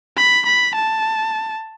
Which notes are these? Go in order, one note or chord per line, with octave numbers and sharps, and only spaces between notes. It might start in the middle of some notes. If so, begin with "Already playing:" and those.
B5
B5
A5